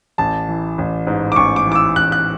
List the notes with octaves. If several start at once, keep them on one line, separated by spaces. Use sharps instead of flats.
A1 A5
E3
A1
G#2
D6
A1 C#6
D6
E3
D6
E6
A1 F#6
F#6